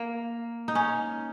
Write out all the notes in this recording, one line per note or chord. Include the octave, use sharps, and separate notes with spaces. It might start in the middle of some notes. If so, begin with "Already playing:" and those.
Already playing: A#3
D#4
C#4